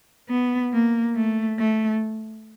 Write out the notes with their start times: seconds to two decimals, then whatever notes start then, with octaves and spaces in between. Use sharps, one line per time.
0.29 B3
0.73 A#3
1.16 A3
1.59 A3